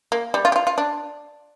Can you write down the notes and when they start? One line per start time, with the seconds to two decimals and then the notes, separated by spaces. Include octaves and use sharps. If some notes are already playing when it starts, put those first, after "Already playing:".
0.12 A#3
0.34 G3
0.45 F4
0.52 G4
0.56 F4
0.67 F4
0.78 D4